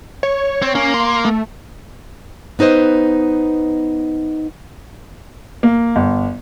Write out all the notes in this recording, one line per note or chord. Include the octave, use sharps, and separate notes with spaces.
C#5
C4
A#3 C#4
C6
A3
B3 D#4 B4 C5 D#5
A#3
G1